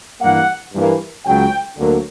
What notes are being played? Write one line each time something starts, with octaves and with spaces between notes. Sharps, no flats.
G2 E3 G3 A#3 F#5
G2 E3 A#3
C#2 C#3 F#3 G5
D2 D3 F#3 A#3